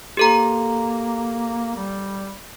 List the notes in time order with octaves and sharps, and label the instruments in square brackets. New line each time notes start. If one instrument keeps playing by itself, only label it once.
[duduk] A#3 [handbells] G4 A4 A#5
[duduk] G3